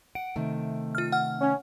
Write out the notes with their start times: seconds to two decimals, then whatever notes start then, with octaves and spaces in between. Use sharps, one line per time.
0.15 F#5 D7
0.36 C3 D#3 A3
0.95 F4 F6
1.12 F#5 F6
1.40 C#4